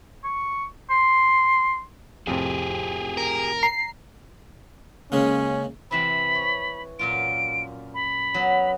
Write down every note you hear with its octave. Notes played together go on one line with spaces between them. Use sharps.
C#6
C6
F2 A2 C3 G4 G#4
A#4
A#5 C7
C#3 G#3 A#3 C#4
C3 E3 C4 B5
C#5
F#2 A#2 F4 D7
B5
F#3 B3